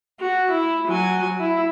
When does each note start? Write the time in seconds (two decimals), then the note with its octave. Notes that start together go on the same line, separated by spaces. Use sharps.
0.21 F#4
0.51 E4
0.88 F#3 G#5
1.39 E4